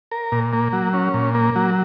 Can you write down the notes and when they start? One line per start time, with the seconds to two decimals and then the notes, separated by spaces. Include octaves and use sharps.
0.11 A#4
0.32 A#2
0.53 A#3
0.73 F#3
0.93 C#4
1.14 A#2
1.34 A#3
1.56 F#3